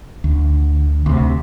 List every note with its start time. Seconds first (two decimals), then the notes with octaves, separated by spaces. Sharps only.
0.24 D2
1.06 D2 C3